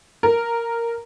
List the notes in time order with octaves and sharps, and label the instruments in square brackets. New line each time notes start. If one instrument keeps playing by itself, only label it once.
[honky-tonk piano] A#4